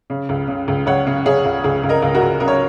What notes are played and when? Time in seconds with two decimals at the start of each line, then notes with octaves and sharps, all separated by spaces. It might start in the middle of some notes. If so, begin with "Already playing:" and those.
0.10 C#3
0.29 C#2
0.48 C#3
0.68 C#2
0.86 C#2 C#5 F#5
1.07 C#3
1.25 C#3 G#4 C#5
1.45 C#2
1.64 C#2 G#4
1.84 C#2
1.89 A#4 D#5
2.02 C#2
2.15 F#4 A#4
2.21 C#2
2.40 C#3 A#4
2.48 C#5